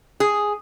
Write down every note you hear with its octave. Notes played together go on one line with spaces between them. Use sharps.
G#4